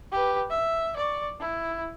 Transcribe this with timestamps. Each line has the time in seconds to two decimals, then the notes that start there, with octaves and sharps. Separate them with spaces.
0.12 G4 B4
0.50 E5
0.96 D5 C#6
1.40 E4